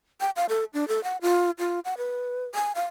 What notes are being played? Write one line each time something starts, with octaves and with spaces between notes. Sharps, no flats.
G5
F5
A4
D4
A4
F#5
F4
F4
F#5
B4
G#5
F5